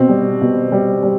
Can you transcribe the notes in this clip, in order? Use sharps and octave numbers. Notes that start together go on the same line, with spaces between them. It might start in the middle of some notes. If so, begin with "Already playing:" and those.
Already playing: B2 C4
G3
B2
G3
G3